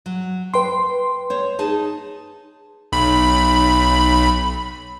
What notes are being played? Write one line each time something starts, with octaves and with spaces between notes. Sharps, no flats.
F#3
B4 G5 C6
C5 C#5
D#4 G#4 A5
B1 B5